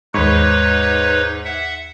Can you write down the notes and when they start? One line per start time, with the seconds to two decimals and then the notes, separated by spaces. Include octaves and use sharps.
0.14 D#2 G#2 D#4 B4 C#5 B5 C#6
1.45 E5 F#5